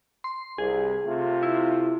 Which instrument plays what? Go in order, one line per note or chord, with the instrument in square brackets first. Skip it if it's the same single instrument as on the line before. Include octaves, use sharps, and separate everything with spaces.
[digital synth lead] C6
[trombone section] C2 [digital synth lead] G#4
[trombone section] C3 A3 F4
[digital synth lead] E4